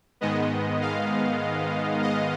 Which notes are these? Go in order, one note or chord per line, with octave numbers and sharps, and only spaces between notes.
G#2 D#3 G#3 B3 D#5
F5
D#5